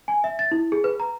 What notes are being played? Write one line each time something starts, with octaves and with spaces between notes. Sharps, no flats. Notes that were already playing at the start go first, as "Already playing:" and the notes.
G#5
E5
A6
E4
G#4
B4
A#5